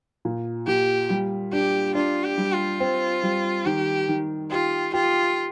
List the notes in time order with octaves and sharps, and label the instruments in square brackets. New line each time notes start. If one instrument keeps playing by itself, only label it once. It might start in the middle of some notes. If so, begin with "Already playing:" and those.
[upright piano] A#2
[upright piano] A#2 [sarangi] G4
[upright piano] G3
[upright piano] D4 [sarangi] G4
[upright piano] D4 [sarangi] F4
[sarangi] G4
[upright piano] G3
[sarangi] F4
[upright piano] C4
G3
[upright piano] D#3 [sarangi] G4
[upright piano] D#3
[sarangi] F4 [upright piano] G4
[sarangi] F4 [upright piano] G4